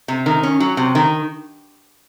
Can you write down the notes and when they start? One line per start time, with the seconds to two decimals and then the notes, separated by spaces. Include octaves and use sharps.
0.08 C3
0.26 D#3
0.43 C#4
0.60 F#3
0.77 C3
0.95 D#3